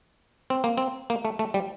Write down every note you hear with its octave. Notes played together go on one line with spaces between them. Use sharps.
C4
A#3
C4
A#3
A3
A3
G3